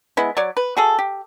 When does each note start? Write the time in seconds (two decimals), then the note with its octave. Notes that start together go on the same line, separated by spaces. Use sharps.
0.17 G#3 B3 E4
0.37 F#3 C#5 D5
0.57 B4
0.77 F#4 G#4 A4
0.98 G4